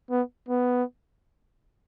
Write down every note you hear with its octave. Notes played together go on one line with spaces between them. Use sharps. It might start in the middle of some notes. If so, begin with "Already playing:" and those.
B3
B3